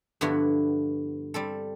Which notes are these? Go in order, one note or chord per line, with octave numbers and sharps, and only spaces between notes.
G2 D3 F3 B3 E4 F#4
G3 C4 A4